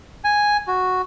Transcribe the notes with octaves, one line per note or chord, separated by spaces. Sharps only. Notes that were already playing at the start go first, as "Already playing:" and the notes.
G#5
F#4